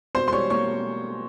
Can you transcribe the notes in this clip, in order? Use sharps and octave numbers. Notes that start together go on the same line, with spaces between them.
B2 C5 C6
C6
G3 C#5 C#6
A#3 C#5 C#6